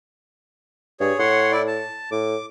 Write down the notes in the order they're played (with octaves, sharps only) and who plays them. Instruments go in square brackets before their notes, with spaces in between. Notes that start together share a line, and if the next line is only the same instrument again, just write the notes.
[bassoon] G2 [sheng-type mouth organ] G#4 C#5
[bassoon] A2 [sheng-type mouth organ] C#5 F#5 C6
[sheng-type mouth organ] E4 D5
A5
[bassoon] A2 [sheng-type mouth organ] D6